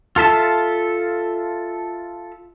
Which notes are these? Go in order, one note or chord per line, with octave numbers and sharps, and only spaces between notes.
F4 A4 E5 A5